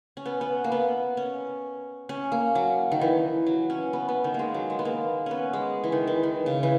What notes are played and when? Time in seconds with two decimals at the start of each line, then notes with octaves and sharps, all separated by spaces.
0.17 C#4
0.25 B3
0.41 B3
0.64 A#3
0.72 B3
1.17 C#4
2.09 C#4
2.32 A#3
2.55 F#3
2.92 D#3
3.01 E3
3.46 F#3
3.70 C#4
3.93 B3
4.09 B3
4.24 D#3
4.34 G#3 A#3
4.54 F#3
4.70 G#3
4.79 B3
4.85 A#3
5.26 B3 C#4
5.53 G#3
5.84 E3
5.92 D#3
6.07 E3
6.23 D#3
6.46 C#3
6.63 E3